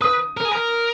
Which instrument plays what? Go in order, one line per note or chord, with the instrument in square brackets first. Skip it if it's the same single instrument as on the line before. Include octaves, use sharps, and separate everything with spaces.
[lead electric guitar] B4 [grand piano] D#6
[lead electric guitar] A#4
G#4
A#4